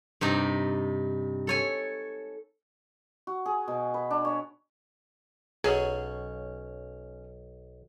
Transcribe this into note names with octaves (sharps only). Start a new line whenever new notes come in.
G2 C3 D#4
A4 C#5 G#5
F#4
G#4
B2
B4
D4
C#5
B1 F#3 C#4 G#4